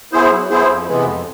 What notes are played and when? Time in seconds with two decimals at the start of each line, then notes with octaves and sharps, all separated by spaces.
0.12 B3 E4 G#4 C5
0.31 F#3
0.50 B3 E4 G#4 C5
0.68 F2
0.87 C3 E3 G#3 B3
1.05 F2